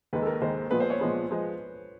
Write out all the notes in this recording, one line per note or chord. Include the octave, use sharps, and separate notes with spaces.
D#2 D#3 G#3 B4
A4
A#4
D#2 D#3 G#3 C5
A#2 F3 G#3 B3 B4
C5
C#5
A#2 F3 G#3 B3
F3 G#3